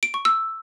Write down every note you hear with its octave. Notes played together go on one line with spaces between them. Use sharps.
D7
C#6
E6